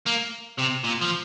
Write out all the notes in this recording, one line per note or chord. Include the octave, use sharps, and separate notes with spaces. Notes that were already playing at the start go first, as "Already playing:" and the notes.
A#3
C3
A#2
F3